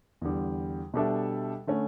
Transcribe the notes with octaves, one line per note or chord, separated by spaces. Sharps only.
E2 D3 G3
B2 G3 D4 A4 E5
D3 A3 C#4